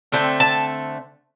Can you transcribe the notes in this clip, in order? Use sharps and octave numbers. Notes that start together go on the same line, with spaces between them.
D3 A3 C4 G5
A5